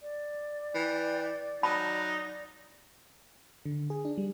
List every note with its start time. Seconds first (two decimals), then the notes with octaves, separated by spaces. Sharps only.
0.02 D5
0.74 E3 G5
1.63 F#3 D#4 A5 B5
3.65 D3
3.90 G#4
4.05 D4
4.18 G3